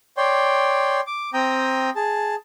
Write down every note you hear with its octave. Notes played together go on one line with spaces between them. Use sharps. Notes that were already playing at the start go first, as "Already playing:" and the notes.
C#5 D5 G5 C6
D6
C4 G5 A#5 D#6
G#4 A5